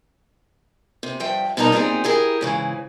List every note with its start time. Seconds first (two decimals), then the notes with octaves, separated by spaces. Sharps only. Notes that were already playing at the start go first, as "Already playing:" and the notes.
1.03 C3
1.20 G2 F3 E5 G5
1.57 B2 G3 D#4 A#4 A#5
1.72 A#2 C4 D#4 E4 G4 G#4
2.04 E4 G4 G#4 A#4
2.41 G#2 C#3 E3